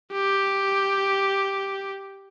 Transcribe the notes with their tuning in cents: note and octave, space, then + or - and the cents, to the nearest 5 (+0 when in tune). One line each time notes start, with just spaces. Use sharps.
G4 +0